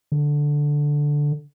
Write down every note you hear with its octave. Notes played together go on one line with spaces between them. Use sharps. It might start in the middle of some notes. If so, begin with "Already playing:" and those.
D3